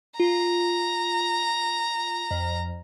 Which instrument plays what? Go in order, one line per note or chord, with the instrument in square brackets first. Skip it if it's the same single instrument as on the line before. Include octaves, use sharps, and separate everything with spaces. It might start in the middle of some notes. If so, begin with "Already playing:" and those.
[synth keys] F4 [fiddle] A#5
[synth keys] F2